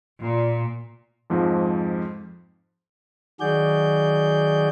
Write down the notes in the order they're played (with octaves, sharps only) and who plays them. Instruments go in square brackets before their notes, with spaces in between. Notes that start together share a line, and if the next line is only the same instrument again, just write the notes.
[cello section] A#2
[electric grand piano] F2 G#2 F3
[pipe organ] D#3 F#3 F#4 G#4 D5 G6